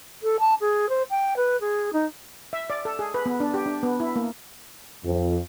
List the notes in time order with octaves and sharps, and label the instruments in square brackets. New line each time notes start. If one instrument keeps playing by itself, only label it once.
[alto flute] A4
A5
G#4
C5
G5
B4
G#4
D#4
[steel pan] E5
D5
A4
G#4
B4
B3
D4
G4
D4
B3
E4
A#3
[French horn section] F2